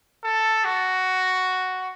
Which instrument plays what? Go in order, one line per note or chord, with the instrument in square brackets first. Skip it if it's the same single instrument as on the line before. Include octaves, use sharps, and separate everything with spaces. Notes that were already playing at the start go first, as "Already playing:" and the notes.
[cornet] A4
F#4